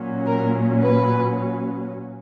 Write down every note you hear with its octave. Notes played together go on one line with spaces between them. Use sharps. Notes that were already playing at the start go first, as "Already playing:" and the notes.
Already playing: A#2 F#3 C#4
A#4
B4